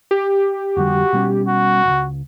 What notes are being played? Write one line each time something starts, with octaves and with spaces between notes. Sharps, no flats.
G4
F2 D3 G3 F#4
B2 G3 C#4
F#4
D#1 C#2